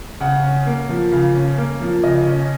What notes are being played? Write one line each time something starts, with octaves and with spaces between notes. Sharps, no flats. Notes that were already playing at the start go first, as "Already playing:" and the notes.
C#3 F#5
C#4
A#3
F3
C#3 F5
C#4
A#3
F3
C#3 D#5
C#4